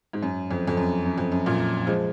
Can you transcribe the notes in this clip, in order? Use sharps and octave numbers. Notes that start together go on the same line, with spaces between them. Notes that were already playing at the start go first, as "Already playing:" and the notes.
G#2
F#2
F2
F2
F#2
F#2
F2
F#2
F#2 A#2
F3 G#3